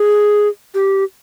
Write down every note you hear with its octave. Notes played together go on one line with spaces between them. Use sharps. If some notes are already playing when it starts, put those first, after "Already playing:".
Already playing: G#4
G4